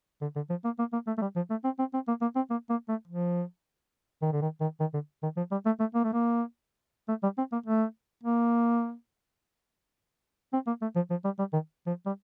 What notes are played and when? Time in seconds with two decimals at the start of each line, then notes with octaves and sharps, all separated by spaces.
0.22 D3
0.36 D3
0.50 F3
0.65 A#3
0.79 A#3
0.93 A#3
1.07 A3
1.18 A3
1.22 G3
1.36 F3
1.50 A3
1.64 C4
1.79 C4
1.94 C4
2.08 A#3
2.22 A#3
2.36 C4
2.50 A#3
2.70 A#3
2.89 A3
3.08 F3
4.22 D#3
4.32 D3
4.42 D#3
4.61 D#3
4.80 D#3
4.94 D3
5.23 D#3
5.37 F3
5.52 G3
5.66 A3
5.80 A3
5.94 A#3
6.04 A3
6.13 A#3
7.09 A3
7.23 G3
7.38 C4
7.52 A#3
7.66 A3
8.24 A#3
10.53 C4
10.67 A#3
10.82 A3
10.96 F3
11.10 F3
11.24 G3
11.39 G3
11.53 D#3
11.87 F3
12.06 G3